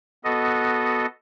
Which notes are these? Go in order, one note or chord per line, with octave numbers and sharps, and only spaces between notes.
B3 F#4 A4 D#5